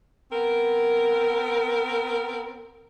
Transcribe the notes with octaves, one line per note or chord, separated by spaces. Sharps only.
B3 C4 A#4